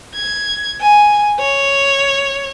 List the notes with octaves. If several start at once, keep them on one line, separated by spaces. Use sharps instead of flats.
G#6
G#5
C#5